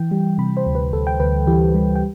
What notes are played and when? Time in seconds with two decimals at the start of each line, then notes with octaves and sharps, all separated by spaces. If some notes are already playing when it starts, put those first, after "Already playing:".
Already playing: E3 G5
0.11 G3
0.38 C3 B5
0.57 C5
0.66 D2
0.75 B4
0.93 D2 A4
1.07 G5
1.20 D2 B4
1.47 E3 G4
1.74 G3
1.96 G5